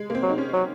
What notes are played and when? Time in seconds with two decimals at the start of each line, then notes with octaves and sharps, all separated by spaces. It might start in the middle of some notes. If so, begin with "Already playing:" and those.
Already playing: G#3
0.10 A#3
0.15 C4
0.22 F#3
0.29 D#4
0.38 C#4
0.53 F#3